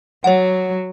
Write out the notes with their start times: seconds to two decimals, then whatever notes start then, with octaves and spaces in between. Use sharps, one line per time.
0.24 F#3 C#5 F#5